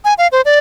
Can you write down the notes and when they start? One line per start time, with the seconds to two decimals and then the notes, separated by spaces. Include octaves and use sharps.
0.05 G#5
0.18 F5
0.32 C5
0.45 D5